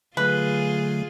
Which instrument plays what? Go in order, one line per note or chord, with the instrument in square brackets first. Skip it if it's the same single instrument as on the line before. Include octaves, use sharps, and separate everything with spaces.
[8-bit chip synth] D3 F#3 A3 [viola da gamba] F4 G#4 [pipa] B4